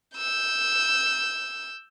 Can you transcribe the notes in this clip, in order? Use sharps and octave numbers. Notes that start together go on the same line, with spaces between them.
E6 G6